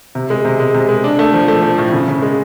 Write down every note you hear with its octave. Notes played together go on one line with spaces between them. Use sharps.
C3
G#3
C3
G#3
C3
G#3
D4
A3
F3
A3
F3
A2
C#3
C#3
G#3